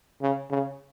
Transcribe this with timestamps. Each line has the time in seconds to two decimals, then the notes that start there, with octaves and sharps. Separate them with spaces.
0.22 C#3
0.51 C#3